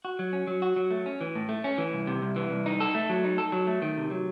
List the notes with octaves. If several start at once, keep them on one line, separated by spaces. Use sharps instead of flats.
F#4
F#3
C#4
F#3
F#4
F#3
A3
C#4
E3
A2
A3
C#4
E3
C2
C3
C2
E3
C2
D#4
A4
A3
F#3
D#4
A4
F#3
A3
D#3
C3
F#3